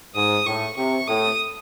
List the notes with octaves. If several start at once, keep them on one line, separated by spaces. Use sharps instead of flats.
G#2 D#6
A2 C#6
C3 C#6
A2 D#6